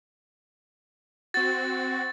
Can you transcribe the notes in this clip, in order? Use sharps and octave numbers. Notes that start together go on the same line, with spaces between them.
C4 F#4 A6